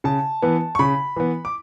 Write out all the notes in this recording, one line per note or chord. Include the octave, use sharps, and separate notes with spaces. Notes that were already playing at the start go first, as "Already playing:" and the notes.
C#3 A5
E3 B3
C#6
C#3 B5
E3 B3
D6